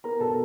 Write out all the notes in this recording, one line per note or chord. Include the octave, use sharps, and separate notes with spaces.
B3 A#4 A#5
B2 A4 A5